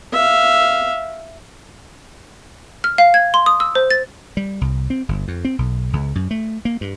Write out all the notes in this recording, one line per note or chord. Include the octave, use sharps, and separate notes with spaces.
E5 F5
F6
F5
G#6
C6
D#6
E6
C5
A6
G3
C2
C4
G1
F2
C4
B1
C#2
F#2
A3
A#3
G2